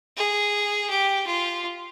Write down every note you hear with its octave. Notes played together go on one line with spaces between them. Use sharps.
G#4
G4
F4